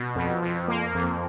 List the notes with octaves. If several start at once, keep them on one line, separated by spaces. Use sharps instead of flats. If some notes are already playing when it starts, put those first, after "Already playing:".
Already playing: B2
F2
F2
A#3
F2